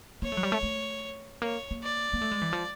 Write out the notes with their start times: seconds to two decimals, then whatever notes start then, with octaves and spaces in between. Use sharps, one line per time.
0.22 A#3 C#5
0.32 A3
0.37 F#3
0.43 G3
0.52 A3
0.63 A3
1.42 A#3 C#5
1.71 A#3
1.83 D5
2.14 A#3
2.21 A3
2.31 G#3
2.41 E3
2.53 F3